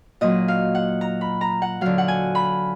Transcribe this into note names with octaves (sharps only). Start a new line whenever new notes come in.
A#2 F#3 D#5
F5
F#5
A#5
B5
A#5
F#5
D3 F#3 F5
F#5
G#5
B5